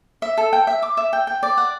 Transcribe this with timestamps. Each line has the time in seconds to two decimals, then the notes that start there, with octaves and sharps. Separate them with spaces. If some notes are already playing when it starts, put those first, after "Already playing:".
0.22 E5
0.38 A4
0.53 G5
0.67 E5
0.82 D6
0.97 E5
1.13 G5
1.27 G5
1.43 D5
1.57 F#5